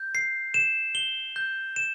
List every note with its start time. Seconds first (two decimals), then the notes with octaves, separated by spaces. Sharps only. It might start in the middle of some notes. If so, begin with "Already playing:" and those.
Already playing: G6
0.15 C7
0.54 E7
0.95 G7
1.36 G6
1.76 E7